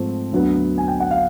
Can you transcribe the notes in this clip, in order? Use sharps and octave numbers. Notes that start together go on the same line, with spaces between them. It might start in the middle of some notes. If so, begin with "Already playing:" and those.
Already playing: G#2 F3 A3 C4
D2 D3 F#3 B3
G#5
G5
F#5
F5